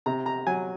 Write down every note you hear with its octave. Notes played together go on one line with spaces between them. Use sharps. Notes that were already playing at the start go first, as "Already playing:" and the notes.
C3 A#5
A#5
F#3 G#5